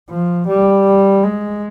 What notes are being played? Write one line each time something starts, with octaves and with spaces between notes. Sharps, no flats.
F3
G3
G#3